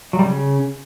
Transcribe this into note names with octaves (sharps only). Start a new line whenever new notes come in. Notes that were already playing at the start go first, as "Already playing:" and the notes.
F#3
G3
C#3